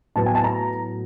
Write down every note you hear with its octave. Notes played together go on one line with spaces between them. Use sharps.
A2 F#3 B3 A5
G#5
A5
A#5